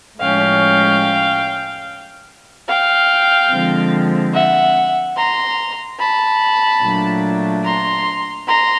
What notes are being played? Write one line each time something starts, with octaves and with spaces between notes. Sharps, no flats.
A2 F3 G#3 C#4 F5 G5
F5 G5
D3 F3 G#3 C4
E5 F#5
A#5 C6
A5 B5
A#2 F#3 A3 D4
A#5 C6
A#5 C6